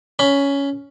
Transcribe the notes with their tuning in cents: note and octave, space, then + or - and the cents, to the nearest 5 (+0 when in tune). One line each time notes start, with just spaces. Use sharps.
C#4 +10 B5 +0